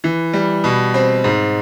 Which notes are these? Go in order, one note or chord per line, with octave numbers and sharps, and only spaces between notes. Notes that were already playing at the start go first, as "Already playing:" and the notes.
E3
G3
B2
C4
G#2